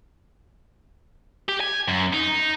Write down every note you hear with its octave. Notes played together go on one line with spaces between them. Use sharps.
G4
G#5
F#2
D#4